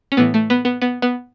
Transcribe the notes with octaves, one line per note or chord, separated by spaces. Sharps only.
C#4
A2 E3 B3
A3
B3
B3
B3
B3